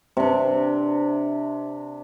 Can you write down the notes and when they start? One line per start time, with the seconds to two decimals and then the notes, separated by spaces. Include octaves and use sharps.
0.17 C3 D4